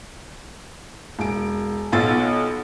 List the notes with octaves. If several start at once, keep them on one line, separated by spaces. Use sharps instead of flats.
E1 D7
B1 B3 F4 E6 A6